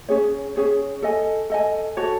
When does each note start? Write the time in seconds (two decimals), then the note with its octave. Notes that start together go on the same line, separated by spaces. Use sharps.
0.09 C#4 G#4 C#5
0.56 C#4 G#4 C#5
1.02 A4 D#5 G#5
1.50 A4 D#5 G#5
1.97 F#4 A4 C#5